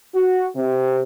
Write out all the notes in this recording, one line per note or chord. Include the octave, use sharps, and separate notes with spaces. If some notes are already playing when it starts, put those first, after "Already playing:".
F#4
C3